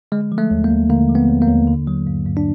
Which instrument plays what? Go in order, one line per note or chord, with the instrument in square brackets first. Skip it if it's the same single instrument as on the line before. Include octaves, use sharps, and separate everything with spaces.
[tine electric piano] D3 G#3
F3
A3
D#2
A#3
D#2
D3 A#3
F3
B3
D#2
A#3
D#2
D3
F#3
G2
G2
D4